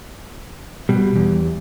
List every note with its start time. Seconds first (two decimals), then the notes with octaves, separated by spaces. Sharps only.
0.89 B2 G3
1.16 E2